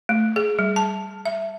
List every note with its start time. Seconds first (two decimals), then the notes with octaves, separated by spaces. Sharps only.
0.09 A3
0.36 G#4
0.59 G3
0.76 A5
1.25 E5